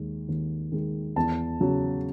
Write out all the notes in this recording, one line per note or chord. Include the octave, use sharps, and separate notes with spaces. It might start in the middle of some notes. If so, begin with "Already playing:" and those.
Already playing: D#2 D#3 G#3
D#2
D#3 G#3
E2 A5
C#3 F#3